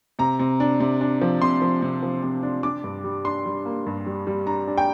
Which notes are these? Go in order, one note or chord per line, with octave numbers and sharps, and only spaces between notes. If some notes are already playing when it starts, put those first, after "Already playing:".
C3 A#5
C3
D4
C3
D4
F3
C3 C6
F3
C3
F3
C3
D4
D4 D6
G2
G3
D4 C6
G3
A#3
G2
G3
G3
D4 A#5
D4
G5